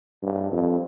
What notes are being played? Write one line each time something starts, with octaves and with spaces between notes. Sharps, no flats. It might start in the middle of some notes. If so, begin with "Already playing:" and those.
G2
F2